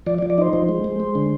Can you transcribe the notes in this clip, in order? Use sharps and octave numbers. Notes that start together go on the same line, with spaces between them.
F3 D5
D5
F3
D5
D#4 C5
F3 C5
G#3
G#3
G#3
D3